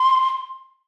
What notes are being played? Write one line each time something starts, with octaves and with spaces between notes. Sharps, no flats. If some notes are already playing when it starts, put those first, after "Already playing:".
Already playing: C6